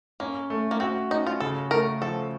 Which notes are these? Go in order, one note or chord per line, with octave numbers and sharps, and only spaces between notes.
A#3 C#4
A3
A#3
C4 F#4
C#4 D#4
F4
C#3 A4
A3 A#4
F3 A4